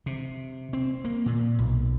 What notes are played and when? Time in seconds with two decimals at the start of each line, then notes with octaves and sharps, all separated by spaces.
0.06 C3
0.73 C4
1.04 A#3
1.26 A#2
1.59 B1